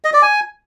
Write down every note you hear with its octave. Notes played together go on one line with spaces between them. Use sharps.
D#5
D5
G#5